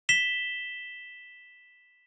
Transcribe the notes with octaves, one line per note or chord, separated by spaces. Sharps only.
B6 E7 G7